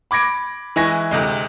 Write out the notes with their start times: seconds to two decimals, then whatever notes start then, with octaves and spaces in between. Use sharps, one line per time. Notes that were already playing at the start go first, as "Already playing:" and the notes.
0.11 B5 D6 G#6 A#6 D7
0.76 E3 G#3 E4 G#5 C#6 A#6
1.11 D2 C3 G#3